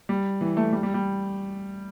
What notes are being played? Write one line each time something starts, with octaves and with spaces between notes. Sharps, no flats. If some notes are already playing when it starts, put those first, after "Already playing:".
G3
E3
A3
G3
G3
G3